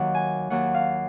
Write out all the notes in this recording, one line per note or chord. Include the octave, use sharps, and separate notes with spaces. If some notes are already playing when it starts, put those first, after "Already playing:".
Already playing: D#2 D#3 F#3 F#5
G#5
D#2 D#3 F#3 F#5
F5